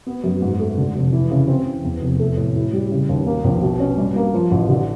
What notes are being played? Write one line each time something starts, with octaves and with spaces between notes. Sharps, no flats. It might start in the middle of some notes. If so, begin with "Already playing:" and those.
B3
F#2
G#2
A3
D3
F1
E3
C#3
C4
E3
E2
F1
A3
A2
E4
G3
C#3
D#2
A#3
A#1
B2
C#4
G2
A#3
F3
A1
D3